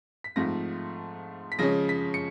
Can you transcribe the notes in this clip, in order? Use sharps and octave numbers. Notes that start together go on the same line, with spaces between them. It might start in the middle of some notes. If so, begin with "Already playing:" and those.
B6
G#2 F3 A3 C4 F4 A#6
B6
C#3 F3 G#3 C#4 A#6
B6
C#7